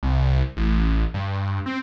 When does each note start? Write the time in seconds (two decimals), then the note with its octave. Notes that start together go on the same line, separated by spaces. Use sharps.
0.03 C2
0.57 A1
1.14 G2
1.66 C4